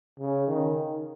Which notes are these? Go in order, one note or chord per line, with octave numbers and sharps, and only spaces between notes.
C#3
D#3